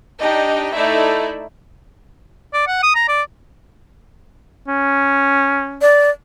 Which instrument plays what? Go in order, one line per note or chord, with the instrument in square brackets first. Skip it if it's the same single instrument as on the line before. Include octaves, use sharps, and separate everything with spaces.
[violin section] D4 D#4 G4 D#5
A3 D#4 E4 D5 E5
[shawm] D5
F#5
D#6
A#5
D5
[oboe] C#4
[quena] D5